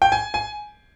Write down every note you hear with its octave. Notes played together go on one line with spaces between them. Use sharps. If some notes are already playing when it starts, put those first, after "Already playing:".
G5
G#5
G#5